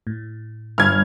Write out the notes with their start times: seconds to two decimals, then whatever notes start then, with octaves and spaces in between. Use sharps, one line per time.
0.07 A2
0.78 G1 F6 G#6